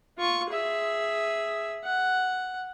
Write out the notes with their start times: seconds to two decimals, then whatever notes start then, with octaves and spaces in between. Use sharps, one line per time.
0.18 F4 C#6
0.50 G#4 E5
1.84 F#5